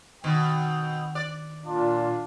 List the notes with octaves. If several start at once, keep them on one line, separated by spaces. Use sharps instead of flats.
B2 D#3 C4 F#5 G5
D5 F#6
A#2 D4 F4